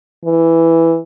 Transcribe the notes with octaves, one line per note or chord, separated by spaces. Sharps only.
E3